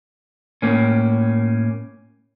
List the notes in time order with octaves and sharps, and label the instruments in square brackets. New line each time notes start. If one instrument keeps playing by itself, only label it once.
[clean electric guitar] A2 A#3 C#4